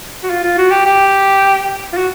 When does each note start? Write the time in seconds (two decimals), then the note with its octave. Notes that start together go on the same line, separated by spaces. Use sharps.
0.24 F#4
0.30 F4
0.44 F4
0.58 F#4
0.71 G4
0.86 G4
1.93 F4
1.97 F#4